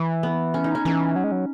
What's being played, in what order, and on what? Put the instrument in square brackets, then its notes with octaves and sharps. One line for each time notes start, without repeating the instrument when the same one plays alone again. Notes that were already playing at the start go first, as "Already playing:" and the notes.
Already playing: [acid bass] E3
[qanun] B3
C#4
D#4
C#4
[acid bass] E3 [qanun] C#4
[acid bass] F#3
G#3
F#3